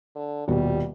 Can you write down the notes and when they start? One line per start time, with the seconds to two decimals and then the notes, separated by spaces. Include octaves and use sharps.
0.15 D3
0.48 D#1 B2 G3